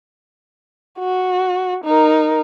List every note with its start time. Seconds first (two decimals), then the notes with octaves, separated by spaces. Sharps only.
0.99 F#4
1.84 D#4 A#4